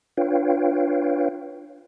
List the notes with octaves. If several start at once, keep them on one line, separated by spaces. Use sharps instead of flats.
D4 F4 B4 C#5 F5 G5